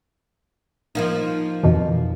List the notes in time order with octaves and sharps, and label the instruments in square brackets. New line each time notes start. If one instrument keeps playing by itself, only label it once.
[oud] F3 A#3 D#4
[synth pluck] F2 B2 E3